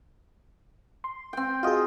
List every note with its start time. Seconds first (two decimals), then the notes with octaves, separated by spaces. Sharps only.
1.04 C6
1.33 C4 G5
1.63 F4 F#4 G#4 D#5